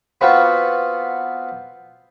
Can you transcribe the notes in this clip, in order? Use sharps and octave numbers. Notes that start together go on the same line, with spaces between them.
B3 C4 F4 F#4 B4